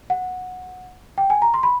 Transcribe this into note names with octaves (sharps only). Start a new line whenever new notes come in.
F#5
G5
G#5
A#5
C6
B5